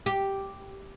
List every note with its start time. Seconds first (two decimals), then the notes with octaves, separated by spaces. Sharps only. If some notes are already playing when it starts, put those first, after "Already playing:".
0.06 G4